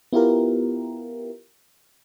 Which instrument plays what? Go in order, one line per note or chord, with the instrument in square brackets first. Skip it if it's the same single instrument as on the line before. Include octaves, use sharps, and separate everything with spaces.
[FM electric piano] B3 E4 F4 G4 A#4